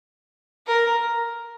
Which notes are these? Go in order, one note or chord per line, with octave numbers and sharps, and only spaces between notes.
A#4